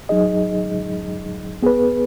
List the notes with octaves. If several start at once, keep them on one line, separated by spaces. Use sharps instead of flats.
F#3 D#4 G#4 D#5
B3 G#4 B4